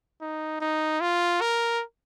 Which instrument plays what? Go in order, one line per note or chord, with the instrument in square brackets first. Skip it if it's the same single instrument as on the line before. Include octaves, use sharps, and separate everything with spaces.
[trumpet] D#4
D#4
F4
A#4